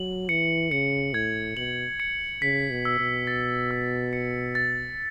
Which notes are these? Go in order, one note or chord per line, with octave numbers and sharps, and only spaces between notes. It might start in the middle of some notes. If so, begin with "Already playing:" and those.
Already playing: F#3 F#7
E3 C#7
C#3 C#7
A2 G#6
B2 F#7
C#7
C#3 B6
B2
E6
B2
A6
E6
C#7
A6